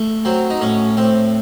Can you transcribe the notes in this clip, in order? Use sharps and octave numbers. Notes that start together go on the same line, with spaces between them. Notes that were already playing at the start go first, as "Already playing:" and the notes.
Already playing: A3
F#3 C4
D#4
A2 C#4
A2 C4